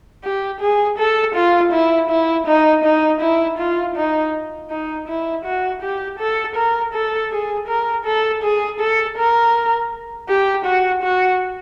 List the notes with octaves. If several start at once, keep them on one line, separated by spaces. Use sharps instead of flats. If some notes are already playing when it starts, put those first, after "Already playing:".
G4
G#4
A4
F4
E4
E4
D#4
D#4
E4
F4
D#4
D#4
E4
F#4
G4
A4
A#4
A4
G#4
A#4
A4
G#4
A4
A#4
G4
F#4
F#4